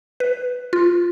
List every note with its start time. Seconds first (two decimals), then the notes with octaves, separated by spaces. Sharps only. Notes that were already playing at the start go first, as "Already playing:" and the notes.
0.20 B4
0.73 F4